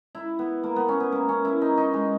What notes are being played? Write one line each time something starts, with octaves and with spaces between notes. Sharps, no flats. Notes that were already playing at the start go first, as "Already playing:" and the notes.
E4
B3
A#3
B3
C#4
B3
A#3
C#4
E4
D#4
D#4
G#3